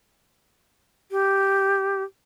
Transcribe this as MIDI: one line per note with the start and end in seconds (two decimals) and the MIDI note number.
1.11 2.03 67